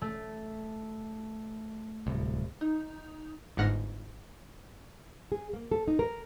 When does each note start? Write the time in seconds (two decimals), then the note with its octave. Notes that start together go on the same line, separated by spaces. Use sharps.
0.01 A3
2.07 D1 G1 C2
2.61 D#4
3.57 G1 G#2 F#5 F6 A#6
5.32 G#4
5.53 A#3
5.71 A4
5.88 D#4
5.99 A#4